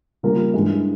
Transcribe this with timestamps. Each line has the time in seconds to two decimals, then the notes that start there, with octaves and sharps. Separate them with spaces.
0.23 C#3 G3 A#3 F4 A#4
0.54 G2 E3 G#3